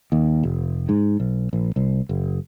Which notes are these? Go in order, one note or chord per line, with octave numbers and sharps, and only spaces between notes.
D#2
F1
G#2
B1
A#1
C2
F#1